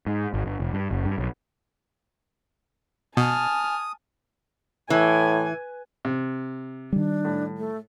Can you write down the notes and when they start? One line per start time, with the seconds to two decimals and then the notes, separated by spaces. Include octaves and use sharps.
0.06 G#2
0.34 G#1
0.46 G1
0.60 F1
0.73 G2
0.91 F#1
1.05 G2
1.18 B1
3.17 B2 G#5 A5 D#6 F6
4.90 A2 E3 G#5
6.05 C3
6.93 D#3 G3 D4
7.25 A2
7.57 A3